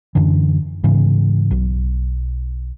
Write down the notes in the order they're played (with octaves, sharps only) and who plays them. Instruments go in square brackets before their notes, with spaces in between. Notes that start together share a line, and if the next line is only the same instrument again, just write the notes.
[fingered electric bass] F#2 D3 E3
G#2 C#3 E3
B1